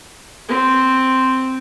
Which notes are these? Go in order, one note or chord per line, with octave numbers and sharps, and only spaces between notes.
C4